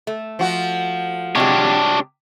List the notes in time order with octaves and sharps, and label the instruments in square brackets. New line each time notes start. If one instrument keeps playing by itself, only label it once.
[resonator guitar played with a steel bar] A3
[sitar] F3 F#4
[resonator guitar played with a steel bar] C3 G#3 G4 [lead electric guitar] D4 C#5